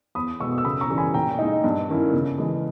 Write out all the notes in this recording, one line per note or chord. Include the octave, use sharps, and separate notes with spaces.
E2 B5 D#6
B2 G#3 C#6 E6
E6
C#3 B5 D#6
A#5 C#6
E3 G3 C#4
G#5 B5
A#2 G5 A#5
G#3 D#4
G2
D#3 A#3 C#4 E4
C#3
E3 G#3